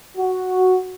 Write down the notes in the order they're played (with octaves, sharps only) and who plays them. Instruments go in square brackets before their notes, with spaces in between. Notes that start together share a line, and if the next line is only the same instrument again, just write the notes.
[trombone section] F#4